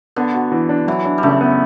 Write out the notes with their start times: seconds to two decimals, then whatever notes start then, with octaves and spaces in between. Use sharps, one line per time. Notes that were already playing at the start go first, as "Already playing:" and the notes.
0.16 D3 B3
0.34 F#4
0.52 E3
0.69 D4
0.87 E3 F#3
1.05 D4
1.18 G3
1.23 C#3 A3
1.41 B3